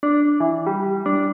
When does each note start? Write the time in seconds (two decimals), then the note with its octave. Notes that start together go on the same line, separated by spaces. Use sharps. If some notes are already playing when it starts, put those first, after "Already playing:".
0.03 D4
0.40 E3
0.67 G3
1.06 D4